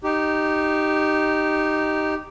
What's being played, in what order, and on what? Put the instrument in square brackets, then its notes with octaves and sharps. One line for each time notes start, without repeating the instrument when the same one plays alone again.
[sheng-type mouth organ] D#4 G4